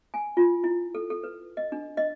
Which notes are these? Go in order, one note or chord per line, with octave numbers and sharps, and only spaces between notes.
G#5
F4
E4
A4
A4
B4
D#5
D4
D#5